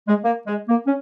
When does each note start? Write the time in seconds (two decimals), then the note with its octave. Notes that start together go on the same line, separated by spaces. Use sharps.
0.08 G#3
0.24 A#3
0.47 G#3
0.69 A#3
0.86 C#4